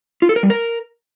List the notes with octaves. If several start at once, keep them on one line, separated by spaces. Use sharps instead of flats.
F4
A4
A#4
G3
A#4